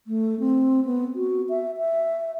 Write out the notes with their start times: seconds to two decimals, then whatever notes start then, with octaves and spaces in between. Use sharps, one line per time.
0.07 A3
0.40 C4
0.85 B3
1.15 F#4
1.49 E5
1.77 E5